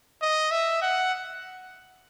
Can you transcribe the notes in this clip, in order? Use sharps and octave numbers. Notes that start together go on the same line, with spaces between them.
D#5
E5
F#5